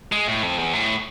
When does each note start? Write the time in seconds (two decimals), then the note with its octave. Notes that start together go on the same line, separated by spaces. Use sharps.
0.12 G#3
0.27 A2
0.43 F2
0.58 E2
0.73 A2